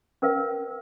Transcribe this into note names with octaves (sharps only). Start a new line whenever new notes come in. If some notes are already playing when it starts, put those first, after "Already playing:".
C#4 A#4 B4 F5